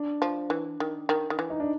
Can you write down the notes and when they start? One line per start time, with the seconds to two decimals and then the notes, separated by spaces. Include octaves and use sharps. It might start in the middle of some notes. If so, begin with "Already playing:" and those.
Already playing: D4
0.22 F3
0.50 E3
0.80 D#3
1.09 D#3
1.30 D#3
1.39 E3
1.50 D#4
1.60 D4